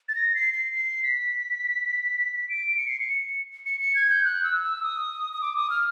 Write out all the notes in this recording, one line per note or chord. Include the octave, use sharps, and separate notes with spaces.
A6
A#6
C7
C7
C7
B6
D7
C#7
C7
C#7
C#7
C#7
G#6
G6
F#6
E6
E6
D#6
D#6
D6
D#6
F6